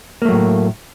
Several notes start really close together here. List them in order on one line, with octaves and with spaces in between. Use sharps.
A#3 A3 F#3 A2